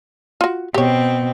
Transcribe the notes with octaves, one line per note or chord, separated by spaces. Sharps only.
F4 F#4
B2 C4 G4 C#5